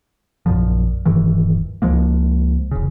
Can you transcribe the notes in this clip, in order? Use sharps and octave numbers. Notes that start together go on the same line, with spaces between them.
A#1 F#2 A#2 F3
D#1 G2 D#3 E3
C#2 F3 G#3 A#3
E1 C#3